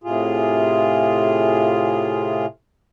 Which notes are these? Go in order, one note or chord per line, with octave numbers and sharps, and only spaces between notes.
A2 C3 F4 G#4